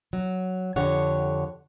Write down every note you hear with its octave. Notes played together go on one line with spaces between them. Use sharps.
F#3
F2 D3 G4 C#5 F#5